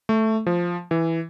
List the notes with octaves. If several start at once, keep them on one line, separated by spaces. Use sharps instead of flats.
A3
F3
E3